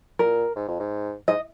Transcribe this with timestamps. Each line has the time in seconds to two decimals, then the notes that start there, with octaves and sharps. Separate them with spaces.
0.19 A#2 A#4
0.56 G#2
0.68 F2
0.80 G#2
1.28 G#2 D#5